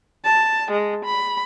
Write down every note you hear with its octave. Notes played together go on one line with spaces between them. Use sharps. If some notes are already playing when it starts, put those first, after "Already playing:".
A5
G#3
B5